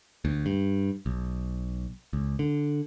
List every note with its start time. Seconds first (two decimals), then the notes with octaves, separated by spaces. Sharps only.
0.25 D2
0.46 G2
1.06 B1
2.13 C#2
2.39 D3